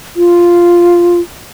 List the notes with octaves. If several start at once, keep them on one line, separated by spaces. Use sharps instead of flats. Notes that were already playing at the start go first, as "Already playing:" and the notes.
F4